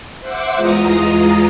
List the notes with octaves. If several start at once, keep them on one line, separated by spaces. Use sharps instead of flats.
C5 E5 F#5 D6
E2 G#3 F4 A#5 D#6